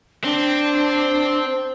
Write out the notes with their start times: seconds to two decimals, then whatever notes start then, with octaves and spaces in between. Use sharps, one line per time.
0.25 C4 D4